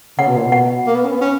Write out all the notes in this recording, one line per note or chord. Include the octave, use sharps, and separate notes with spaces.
C#3 F#5
B2
A#2
B2
F#5
A#3
B3
C#4
B3
C#4